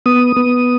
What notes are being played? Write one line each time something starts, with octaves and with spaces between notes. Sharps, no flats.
B3 D#6
B3